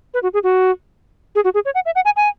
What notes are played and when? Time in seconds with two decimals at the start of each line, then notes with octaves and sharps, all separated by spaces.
0.14 B4
0.23 F#4
0.34 G#4
0.43 F#4
1.35 G#4
1.44 F#4
1.54 G#4
1.65 C#5
1.75 F#5
1.86 E5
1.95 F#5
2.05 G#5
2.16 G#5